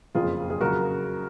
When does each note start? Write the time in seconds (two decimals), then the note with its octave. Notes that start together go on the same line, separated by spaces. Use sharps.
0.15 F#1 F2 F3 F4 G#4
0.50 G#4
0.61 C#3 F#3 F#4 A#4